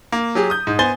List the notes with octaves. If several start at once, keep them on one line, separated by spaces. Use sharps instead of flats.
A#3
F#3 G4 G#4
D#6 G6
G#2
B3 C5 G#5 A6 G7